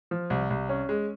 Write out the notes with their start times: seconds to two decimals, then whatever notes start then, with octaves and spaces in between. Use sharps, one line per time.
0.11 F3
0.30 C2
0.50 C2
0.69 C#4
0.89 G#3